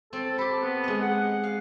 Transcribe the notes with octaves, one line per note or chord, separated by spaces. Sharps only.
C4 A4
G4 A4 B5
B3
G#3 D#5
F#5
F5